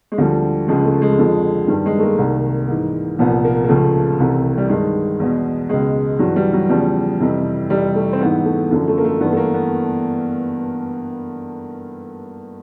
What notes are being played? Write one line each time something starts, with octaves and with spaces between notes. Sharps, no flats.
G#3
D2 D3 F3 G3
C#2 C#3 F3 G#3
A3
G#3
F2 D3 F3
G2 D#3 G3
G#3
A3
A#3
C2 C3 D#3
G#2 E3
C2 A#2 F3 B3
A#3
A#3
C#2 C#3 F3 A3
C2 C3 E3
G3
G2 D#3 G#3
E2 B2
C#2 B2 G#3
G2 E3 F#3
G3
F#3
E2 C#3 F3 G3
F2 C3 E3
F2 C3 E3 G3
A3
C4
G#2 E3 B3
A3
F#2 D3 F3
A3
A#3
A3
G2 E3 B3
A3
A#3
B3